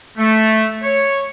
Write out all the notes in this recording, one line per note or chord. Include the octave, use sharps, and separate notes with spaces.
A3
C#5